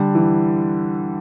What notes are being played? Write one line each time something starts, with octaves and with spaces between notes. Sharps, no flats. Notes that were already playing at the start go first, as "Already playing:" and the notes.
Already playing: D3 G3
E3